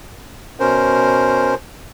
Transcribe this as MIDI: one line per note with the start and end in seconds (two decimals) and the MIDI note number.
0.60 1.55 47
0.60 1.55 61
0.60 1.55 70
0.60 1.55 72